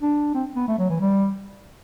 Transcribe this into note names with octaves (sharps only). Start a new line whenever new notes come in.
D4
C4
B3
A3
F#3
E3
G3